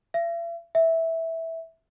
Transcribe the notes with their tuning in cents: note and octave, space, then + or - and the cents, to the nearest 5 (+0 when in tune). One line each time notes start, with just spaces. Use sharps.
E5 +45
E5 -10